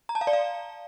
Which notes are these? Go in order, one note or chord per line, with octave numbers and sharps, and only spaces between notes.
A#5
A5
F5
D5
F5